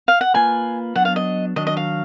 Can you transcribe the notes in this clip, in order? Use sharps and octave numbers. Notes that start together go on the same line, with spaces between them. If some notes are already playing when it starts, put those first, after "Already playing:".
F5
F#5
A#3 F4 B4 G#5
F#3 B3 D4 F#5
F5
D#5
D#3 F#3 D4 D#5
D#5
F5